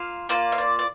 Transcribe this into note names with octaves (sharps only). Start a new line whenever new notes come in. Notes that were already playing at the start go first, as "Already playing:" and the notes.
Already playing: A#3 F4 F5
A#3 F4 D5
F5
D5
D5